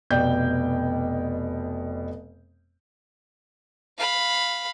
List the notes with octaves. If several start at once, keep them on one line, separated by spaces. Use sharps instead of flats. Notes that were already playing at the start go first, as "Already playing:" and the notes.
F1 B2 D5 G5 G6
F5 B5